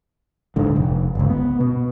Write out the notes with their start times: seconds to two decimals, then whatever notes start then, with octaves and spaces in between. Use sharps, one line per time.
0.56 D#1 G#1 G#2 D3
0.76 F1
1.15 G1 C#2
1.30 B3
1.60 B2